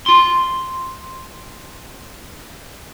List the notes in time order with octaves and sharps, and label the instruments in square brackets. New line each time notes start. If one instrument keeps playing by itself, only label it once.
[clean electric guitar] F4 C6